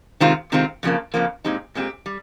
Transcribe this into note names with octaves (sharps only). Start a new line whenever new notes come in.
C3 D#3 G#3 C4 F4
C3 D#3 G#3 C4 F4
F2 C#3 F3 A#3
F2 C#3 F3 A#3
A#2 G#3 C4 D#4 G4
A#2 G#3 C4 D#4 G4
G3